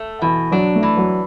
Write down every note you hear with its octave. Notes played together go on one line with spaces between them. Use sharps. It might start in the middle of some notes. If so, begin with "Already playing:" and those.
Already playing: A3
B2 E3
F#3 D4
A3
E3
F#3